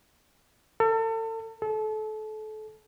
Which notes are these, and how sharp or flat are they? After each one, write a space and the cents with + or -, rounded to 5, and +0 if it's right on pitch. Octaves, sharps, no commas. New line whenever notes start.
A4 +35
A4 -30